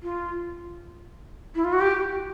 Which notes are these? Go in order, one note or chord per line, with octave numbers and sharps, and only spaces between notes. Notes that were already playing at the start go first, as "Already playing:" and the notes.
F4
E4
F4
F#4
G4